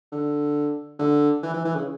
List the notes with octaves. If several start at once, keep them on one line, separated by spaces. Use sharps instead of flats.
D3
D3
E3
E3
E3
C#3